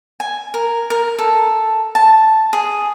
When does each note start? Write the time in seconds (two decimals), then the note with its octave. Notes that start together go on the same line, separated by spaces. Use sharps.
0.20 G#5
0.54 A#4
0.90 A#4
1.18 A4
1.95 A5
2.53 G#4